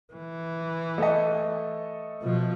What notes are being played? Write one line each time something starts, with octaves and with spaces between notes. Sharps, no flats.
E3
A3 A4 D#5
B2 F3